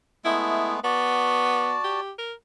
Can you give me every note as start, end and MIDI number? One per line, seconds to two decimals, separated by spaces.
0.25 0.80 56
0.25 0.80 57
0.25 0.80 59
0.25 0.74 64
0.84 1.75 59
0.84 2.00 66
0.84 2.00 74
0.84 2.00 81
1.84 2.11 67
2.18 2.33 70